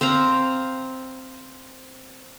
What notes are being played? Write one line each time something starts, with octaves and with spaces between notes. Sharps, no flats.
C4 C5 F5 A#5